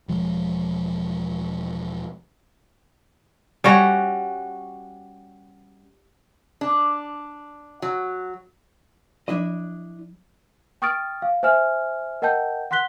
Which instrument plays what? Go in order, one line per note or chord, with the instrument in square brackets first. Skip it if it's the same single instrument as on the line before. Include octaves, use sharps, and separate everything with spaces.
[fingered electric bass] E1 F3 G#3
[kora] G3 C#4 F#4
[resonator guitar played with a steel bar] D4
F#3
[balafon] F3 F#3 [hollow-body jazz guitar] D4 E4 D#5
[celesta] G5 C#6 D#6 F6 A6 D7
F5
C5 E5 G#5 F6
A#4 D#5 F#5 G5 A5 G6
F#5 C6 F#6 B6 G7